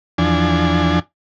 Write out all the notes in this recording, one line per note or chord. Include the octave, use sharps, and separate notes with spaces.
E2 F3 D4 G#5